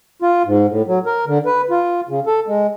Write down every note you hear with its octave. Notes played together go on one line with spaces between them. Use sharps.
F4
G#2
A2
F#3
A#4
D3
B4
F4
C#3
A4
G#3